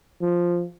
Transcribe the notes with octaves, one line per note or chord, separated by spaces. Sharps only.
F3